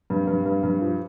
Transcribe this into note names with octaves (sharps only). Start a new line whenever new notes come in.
G2
G2
G2
G2
F3